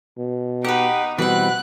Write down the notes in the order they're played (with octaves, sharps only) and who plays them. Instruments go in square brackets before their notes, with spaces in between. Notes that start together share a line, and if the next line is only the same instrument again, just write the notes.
[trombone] B2
[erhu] D#4 [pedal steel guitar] G4 [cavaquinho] B4 F#5
[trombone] B2 [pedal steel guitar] E3 G3 C4 [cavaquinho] B4 F#5 [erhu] F#6